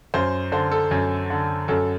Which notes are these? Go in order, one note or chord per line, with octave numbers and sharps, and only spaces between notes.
F#2 C5
D3 C5
A4
F#2
D3
F#2 A4